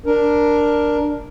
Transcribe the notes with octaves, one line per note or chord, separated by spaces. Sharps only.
D4 A#4